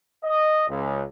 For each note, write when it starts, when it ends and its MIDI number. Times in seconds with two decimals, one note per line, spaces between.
0.24 0.67 75
0.68 1.02 37